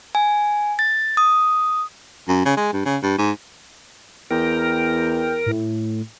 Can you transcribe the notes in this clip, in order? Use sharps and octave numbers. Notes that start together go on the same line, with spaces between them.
G#5
A6
D#6
F#2
C#3
G#3
G2
C#3
G2
G#2
E2 A#4 G5
A2